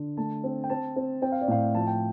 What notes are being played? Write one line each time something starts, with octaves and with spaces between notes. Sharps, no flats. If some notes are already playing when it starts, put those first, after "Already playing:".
Already playing: D3
A3 A5
C4
G5
C4 A5
C4
C4 G5
F5
D5
A2 F5
F3 A5
G5